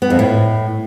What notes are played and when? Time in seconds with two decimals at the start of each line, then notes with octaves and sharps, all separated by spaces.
0.02 B3
0.10 F2
0.19 A2